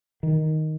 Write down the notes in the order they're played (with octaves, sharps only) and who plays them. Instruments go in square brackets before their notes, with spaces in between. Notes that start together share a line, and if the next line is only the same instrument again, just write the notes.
[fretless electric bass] D#3